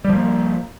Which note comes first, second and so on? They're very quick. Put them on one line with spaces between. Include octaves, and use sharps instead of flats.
G3 F3 A#3